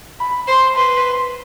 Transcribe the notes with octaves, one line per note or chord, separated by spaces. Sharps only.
B5
C5 C6
B4 C6